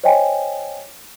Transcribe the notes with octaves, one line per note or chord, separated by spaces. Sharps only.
C5 C#5 D#5 G5 G#5